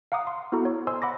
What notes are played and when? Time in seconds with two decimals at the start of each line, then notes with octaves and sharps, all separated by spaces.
0.12 F5 F#5 A#5 D6 D#6
0.27 C6
0.52 B3 E4 F#4 A4 A#5
0.65 C#5
0.87 C5 D#5 G#5 C6 E6
1.02 F#5 B5 D6 A#6